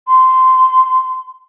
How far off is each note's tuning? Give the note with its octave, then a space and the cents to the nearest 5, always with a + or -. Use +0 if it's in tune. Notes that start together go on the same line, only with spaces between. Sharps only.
C6 -15